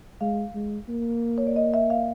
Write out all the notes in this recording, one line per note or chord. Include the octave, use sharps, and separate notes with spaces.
G#3 F5
G#3
A#3
C#5
D5
D#5
E5
F5